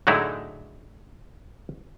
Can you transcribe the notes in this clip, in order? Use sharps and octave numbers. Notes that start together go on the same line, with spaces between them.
A2 D3 F#3 G#3 D#4 E4